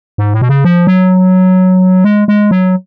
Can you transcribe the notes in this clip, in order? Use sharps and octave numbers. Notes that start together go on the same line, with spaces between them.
G#2
A2
B2
C#3
F3
F#3
G#3
G#3
F#3